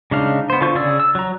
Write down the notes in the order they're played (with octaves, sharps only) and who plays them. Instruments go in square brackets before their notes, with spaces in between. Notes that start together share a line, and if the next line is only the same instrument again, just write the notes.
[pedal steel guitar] C#3 G#3 D4 D#4 F5
B3 C5
D3 F4 F5 C#6 G6
C#3 G#4 D5 E6
E6
F#3 A#5